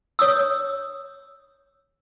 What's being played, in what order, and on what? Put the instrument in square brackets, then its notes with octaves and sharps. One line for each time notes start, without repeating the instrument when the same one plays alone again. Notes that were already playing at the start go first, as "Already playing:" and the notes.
[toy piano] C#5 D#6 E6